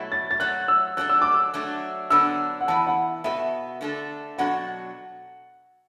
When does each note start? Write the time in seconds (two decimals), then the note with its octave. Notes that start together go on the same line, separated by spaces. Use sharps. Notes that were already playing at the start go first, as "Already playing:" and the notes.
Already playing: B2 F#3 A3 E4 A4
0.12 A6
0.31 A6
0.40 F#3 A3 F#4 F#6
0.68 E6
0.97 F#3 A3 D4 A4 F#6
1.09 E6
1.22 D6
1.34 E6
1.54 F#3 A3 D4
2.10 D3 F#3 B3 D4 A4 E6
2.61 F#5
2.68 E3 B3 E4 A5
2.86 F#5
3.24 B2 B3 F#4 A4 E5
3.81 D3 A3 D4 A4
4.38 B2 F#3 D4 F#4 A4 F#5